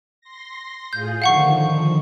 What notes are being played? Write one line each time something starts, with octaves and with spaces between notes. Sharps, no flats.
C6 A#6
A2 F4 G#4 G6
D3 D#3 F3 F5 F#5 C#6